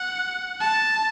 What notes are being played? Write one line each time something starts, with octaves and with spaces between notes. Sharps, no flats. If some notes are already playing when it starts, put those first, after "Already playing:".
Already playing: F#5
A5